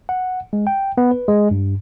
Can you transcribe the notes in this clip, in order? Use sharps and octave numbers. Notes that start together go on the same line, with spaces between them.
F#5
G#3
G5
B3
B4
G#3
G2